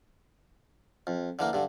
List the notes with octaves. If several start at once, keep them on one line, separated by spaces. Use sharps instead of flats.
F2
D3 E3 A#3
G2 D3